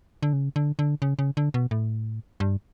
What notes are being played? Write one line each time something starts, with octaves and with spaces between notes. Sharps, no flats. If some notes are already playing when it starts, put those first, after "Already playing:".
D3
C#3
D3
D3
C#3
C#3
D3
B2
A2
G2